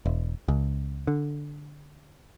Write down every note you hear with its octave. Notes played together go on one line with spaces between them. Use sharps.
E1
C#2
D3